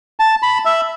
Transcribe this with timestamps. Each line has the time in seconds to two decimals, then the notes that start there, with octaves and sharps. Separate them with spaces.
0.20 A5
0.43 B5
0.65 E5